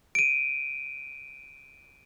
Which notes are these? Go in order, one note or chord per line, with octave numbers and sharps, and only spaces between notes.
D7 D#7